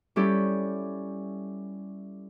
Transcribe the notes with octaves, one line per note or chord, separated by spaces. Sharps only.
G3 C#4 E4 G4 A4